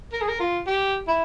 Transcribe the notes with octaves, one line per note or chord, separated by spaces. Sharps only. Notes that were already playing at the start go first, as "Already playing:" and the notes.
A#4
G#4
A#4
F4
G4
E4